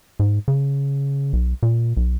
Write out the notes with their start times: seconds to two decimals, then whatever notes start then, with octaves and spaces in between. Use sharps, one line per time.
0.20 G#2
0.48 C#3
1.33 B1
1.63 A#2
1.97 B1